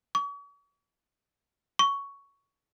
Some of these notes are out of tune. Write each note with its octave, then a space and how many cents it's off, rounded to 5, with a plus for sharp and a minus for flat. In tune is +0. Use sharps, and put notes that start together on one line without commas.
C#6 +40
C#6 +10